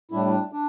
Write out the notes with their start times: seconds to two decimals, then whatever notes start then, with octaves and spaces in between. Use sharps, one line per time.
0.11 A2 G3 D4 E4
0.25 D4
0.52 D4